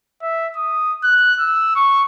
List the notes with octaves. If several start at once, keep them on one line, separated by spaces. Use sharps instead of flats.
E5
D#6
F#6
E6
C#6